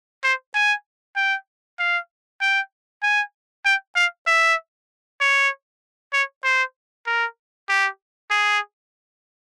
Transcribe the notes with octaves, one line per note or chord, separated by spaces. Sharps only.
C5
G#5
G5
F5
G5
G#5
G5
F5
E5
C#5
C#5
C5
A#4
G4
G#4